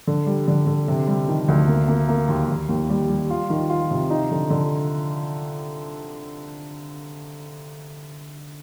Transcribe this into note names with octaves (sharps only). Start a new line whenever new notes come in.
D3
G3
D3
D3
C3
G3
D#3
D2
A#3
A#3
A#3
D#2
D#2
D#2
G3
G3
F4
D#3
F4
C3
D#4
D3
D3